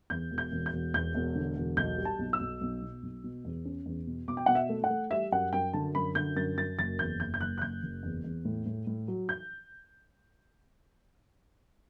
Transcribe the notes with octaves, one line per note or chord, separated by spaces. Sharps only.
E2 G6
E1
G6
E1
G6
E1
E2 G6
E1
D3
E1
B1 G6
G3
A5
B1
E6
B1
B1
B2
B1
B2
E2
C#4
E2
B2
B2 D6
G5
B2 F#5
E5
A3
F#5
A3
G3 E5
F#2 F#5
F#2 G5
D3 A5
F#2 B5
D3 G6
F#2 A6
F#2 A6
F#1 A6
E2 G6
F#1 G6
G6
F#1 F#6
F#6
F#1 G6
F#1
E2
E2
A2
A2
A2
F#3
G6